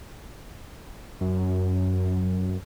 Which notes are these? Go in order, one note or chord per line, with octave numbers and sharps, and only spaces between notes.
F#2